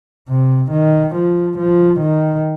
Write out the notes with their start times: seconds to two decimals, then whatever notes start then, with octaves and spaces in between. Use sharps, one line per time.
0.29 C3
0.71 D#3
1.15 F3
1.58 F3
2.01 D#3